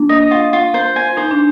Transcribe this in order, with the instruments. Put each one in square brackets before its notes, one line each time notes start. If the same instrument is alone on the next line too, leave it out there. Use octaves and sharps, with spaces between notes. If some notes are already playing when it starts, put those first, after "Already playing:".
Already playing: [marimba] A#3 D4
[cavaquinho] D#5
F4
F4
C5
G#5
[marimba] D#4 [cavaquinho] C5
[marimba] D4